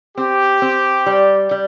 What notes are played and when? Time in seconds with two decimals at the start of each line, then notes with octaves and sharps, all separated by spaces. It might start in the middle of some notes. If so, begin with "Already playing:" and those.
0.17 C4 G4
0.62 C4
1.06 G3
1.51 G3